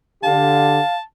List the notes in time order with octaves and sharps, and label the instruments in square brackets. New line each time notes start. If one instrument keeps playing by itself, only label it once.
[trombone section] D3 G4 [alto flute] F5 [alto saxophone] A5